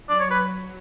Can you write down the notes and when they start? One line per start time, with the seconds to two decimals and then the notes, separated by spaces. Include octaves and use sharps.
0.08 F#3 D5
0.20 C#5
0.31 B4